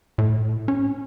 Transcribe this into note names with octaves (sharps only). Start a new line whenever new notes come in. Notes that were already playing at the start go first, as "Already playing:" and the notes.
A2
C#4